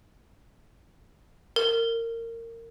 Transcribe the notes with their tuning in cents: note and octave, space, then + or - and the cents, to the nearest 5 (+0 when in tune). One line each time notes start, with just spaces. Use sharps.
A#4 -25